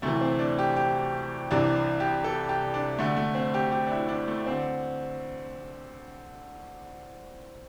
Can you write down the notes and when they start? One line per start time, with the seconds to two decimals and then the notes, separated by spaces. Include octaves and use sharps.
0.02 D2 C3 E3 A3
0.21 C4
0.39 D4
0.59 G4
0.76 G4
1.51 C2 C3 E3 D4
2.00 G4
2.24 A4
2.49 G4
2.74 D4
2.99 D2 D3 A3
3.17 A3
3.35 C4
3.54 G4
3.72 G4
3.87 D4
3.91 E4
4.09 D4
4.28 A3
4.46 D3 C4